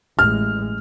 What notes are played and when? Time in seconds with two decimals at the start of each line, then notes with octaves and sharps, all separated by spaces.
0.19 A1 G#3 F6